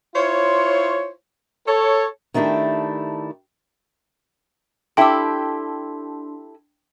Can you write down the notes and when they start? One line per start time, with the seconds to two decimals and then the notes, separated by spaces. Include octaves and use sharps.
0.15 E4 F4 C5 C#5
1.67 A4 C#5
2.34 D#3 A3 D4 E4 G4
4.97 D4 E4 G4 A4 G5 C6 E6